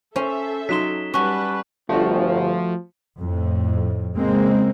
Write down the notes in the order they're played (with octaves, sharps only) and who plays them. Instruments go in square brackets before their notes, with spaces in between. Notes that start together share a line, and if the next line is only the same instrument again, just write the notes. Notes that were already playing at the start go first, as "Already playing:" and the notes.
[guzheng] C#4 [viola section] A4 E5 [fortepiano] C5
[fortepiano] F#3 D#4 C6 [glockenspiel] B6 E7 G7
[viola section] G3 B4 [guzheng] C#4 F#4 [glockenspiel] A5 C#6 F#6
[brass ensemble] G1 [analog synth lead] F3 [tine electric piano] A3 F#4
[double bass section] F2 A2
C#3 G#3 A#3 C4